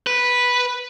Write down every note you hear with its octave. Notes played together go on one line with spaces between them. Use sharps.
B4